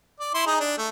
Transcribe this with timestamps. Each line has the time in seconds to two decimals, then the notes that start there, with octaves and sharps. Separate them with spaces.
0.20 D5
0.34 E4 C6
0.46 D#4 G#4
0.60 D4
0.78 A3